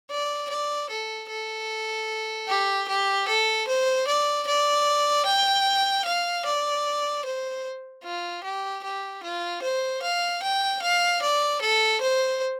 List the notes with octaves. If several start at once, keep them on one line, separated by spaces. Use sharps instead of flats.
D5
D5
A4
A4
G4
G4
A4
C5
D5
D5
G5
F5
D5
C5
F4
G4
G4
F4
C5
F5
G5
F5
D5
A4
C5